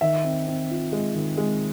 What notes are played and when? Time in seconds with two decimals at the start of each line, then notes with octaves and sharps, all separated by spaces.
0.01 D#3 E5
0.24 C4
0.47 C4
0.70 F4
0.92 G#3
1.14 D#3
1.37 G#3